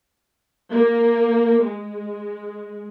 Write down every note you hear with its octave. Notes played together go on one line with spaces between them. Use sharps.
A#3
G#3